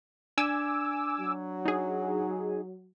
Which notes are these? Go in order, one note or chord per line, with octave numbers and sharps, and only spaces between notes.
D4 G#5 D6 E6 G#6
F#3
D#4 G#4